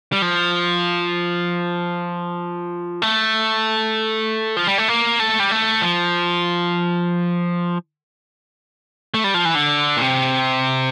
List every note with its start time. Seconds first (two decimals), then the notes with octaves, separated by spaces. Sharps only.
0.12 G3
0.22 F3
3.02 A3
4.57 F3
4.67 G3
4.78 A3
4.88 A#3
5.20 A3
5.40 G3
5.51 A3
5.82 F3
9.14 A3
9.24 G3
9.34 F3
9.45 E3
9.55 D3
9.97 A#2
10.01 C3